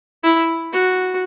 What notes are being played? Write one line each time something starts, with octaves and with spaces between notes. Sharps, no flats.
E4
F#4